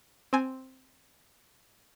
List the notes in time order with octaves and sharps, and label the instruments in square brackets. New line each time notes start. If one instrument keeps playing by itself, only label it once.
[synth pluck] C4 G#5